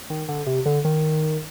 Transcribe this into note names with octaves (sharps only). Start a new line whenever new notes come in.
D#3
D3
C3
D3
D#3